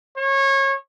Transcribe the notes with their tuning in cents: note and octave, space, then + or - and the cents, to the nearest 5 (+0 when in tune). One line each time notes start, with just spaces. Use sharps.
C#5 -25